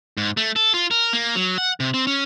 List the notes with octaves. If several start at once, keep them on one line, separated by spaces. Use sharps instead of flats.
G#2
A3
A4
F4
A#4
A#3
F#3
F#5
C3
C4
C#4